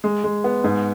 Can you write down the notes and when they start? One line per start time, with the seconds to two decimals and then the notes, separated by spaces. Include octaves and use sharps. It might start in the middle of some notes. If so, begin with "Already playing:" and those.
0.04 G#3
0.24 G#3
0.44 B3
0.64 G#2